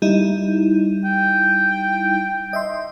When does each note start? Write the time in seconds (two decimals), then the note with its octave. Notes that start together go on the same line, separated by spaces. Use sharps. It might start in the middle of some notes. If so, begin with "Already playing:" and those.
0.02 G3 D#4 E4
1.04 G5
2.53 D#5 E5 C6